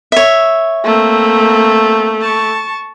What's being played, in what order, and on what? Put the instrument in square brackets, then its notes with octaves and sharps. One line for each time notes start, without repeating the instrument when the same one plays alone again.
[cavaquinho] C#5 E5
[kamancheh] A3 [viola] A#3 C4
[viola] A5 C#6